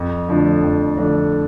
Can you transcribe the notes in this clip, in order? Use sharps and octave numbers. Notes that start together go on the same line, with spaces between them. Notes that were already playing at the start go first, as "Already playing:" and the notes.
Already playing: F2
D3 F3 A3 D4
F2
D3 F3 A3 D4